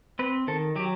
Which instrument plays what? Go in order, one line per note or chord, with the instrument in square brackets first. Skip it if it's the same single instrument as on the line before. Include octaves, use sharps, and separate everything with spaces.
[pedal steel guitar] C4 B4
D#3 A4
F#3 G4